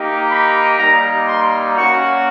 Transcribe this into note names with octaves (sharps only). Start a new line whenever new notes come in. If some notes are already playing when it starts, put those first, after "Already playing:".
Already playing: A#3 D#4 G4
B5
G3 A#3 D#4 A#5
C6
A#3 C#4 F#4 C#6